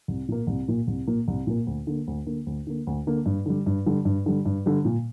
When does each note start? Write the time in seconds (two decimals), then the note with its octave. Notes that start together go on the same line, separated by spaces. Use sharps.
0.08 C2
0.28 A#2 A#3
0.47 C2
0.68 A#2 A#3
0.87 C2
1.07 A#2 A#3
1.28 C2
1.47 A#2 A#3
1.67 D2
1.87 D3 A#3
2.07 D2
2.26 D3 A#3
2.46 D2
2.67 D3 A#3
2.87 D2
3.07 D3 A#3
3.26 G2
3.46 D3 G3
3.66 G2
3.86 D3 G3
4.05 G2
4.26 D3 G3
4.45 G2
4.66 D3 G3
4.85 A#2